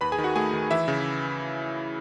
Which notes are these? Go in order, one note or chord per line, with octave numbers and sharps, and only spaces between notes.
D#2 B4 B5
G#4 G#5
D#3
F#4 F#5
A3 G#4 G#5
D#3
E3 E4 E5
C#3